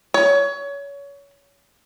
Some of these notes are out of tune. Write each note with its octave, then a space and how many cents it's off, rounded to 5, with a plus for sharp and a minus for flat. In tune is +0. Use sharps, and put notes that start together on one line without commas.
C#5 +25